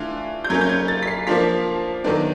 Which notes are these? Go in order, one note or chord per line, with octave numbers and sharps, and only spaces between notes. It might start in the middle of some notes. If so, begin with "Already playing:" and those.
Already playing: E3 A3 D4 F4
G6
F#3 A#3 C#4 G#6
G6
G#6
A6
B6
C7
F3 A#3 D4 F4 B6
D#3 F#3 B3 D4